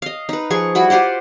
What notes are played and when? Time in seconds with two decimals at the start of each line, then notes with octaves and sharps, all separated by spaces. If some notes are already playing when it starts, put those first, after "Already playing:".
0.02 D#5 F5
0.29 D#4 B4
0.50 F3 G#4 C#6
0.75 G3 E4 F#4 B5
0.90 F4 G4 C5 F#5